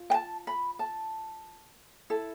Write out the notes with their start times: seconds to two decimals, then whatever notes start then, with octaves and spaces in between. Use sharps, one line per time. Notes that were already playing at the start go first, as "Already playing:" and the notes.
Already playing: F4
0.10 G5
0.14 A5
0.47 B5
0.79 A5
2.10 E4 A4